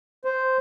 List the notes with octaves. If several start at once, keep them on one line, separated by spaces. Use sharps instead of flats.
C5